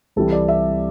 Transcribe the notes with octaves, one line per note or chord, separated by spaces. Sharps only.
C2 C3 E3 G3 A4
D5
E5